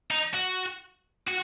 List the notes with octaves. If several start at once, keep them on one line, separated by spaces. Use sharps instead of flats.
D#4
F#4
F#4